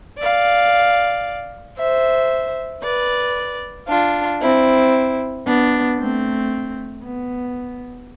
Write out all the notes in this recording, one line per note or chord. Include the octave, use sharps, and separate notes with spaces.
D5 F5
C5 E5
B4 D5
D4 F4
C4 E4
B3 D4
A3 C4
B3